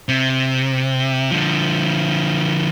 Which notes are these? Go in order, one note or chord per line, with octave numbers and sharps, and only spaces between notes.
C3
D3 F3